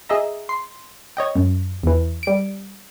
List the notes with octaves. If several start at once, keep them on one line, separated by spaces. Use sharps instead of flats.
G#4 D#5 E5 A#5
C6
C#5 D#5 G5
F#2
E2 E3
G3 D7